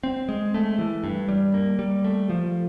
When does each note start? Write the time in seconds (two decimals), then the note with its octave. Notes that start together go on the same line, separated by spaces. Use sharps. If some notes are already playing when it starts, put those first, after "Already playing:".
0.04 C4
0.29 G#3
0.54 A3
0.79 E3
1.04 G2
1.29 G3
1.54 A#3
1.79 G3
2.04 A3
2.29 F3